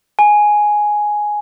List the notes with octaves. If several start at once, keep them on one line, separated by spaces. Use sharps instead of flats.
G#5